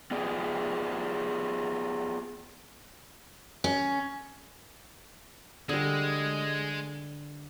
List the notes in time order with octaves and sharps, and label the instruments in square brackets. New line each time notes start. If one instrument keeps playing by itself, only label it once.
[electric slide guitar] B3 F4 G4 G#4 D5
[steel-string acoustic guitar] C#4
[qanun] D3 G3 [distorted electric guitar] G#3